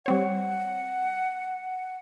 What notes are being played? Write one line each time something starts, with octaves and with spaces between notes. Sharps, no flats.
G3 C4 C#5 F#5